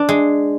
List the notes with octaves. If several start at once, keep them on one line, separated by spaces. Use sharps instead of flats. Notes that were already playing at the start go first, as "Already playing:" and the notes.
Already playing: D4
G#3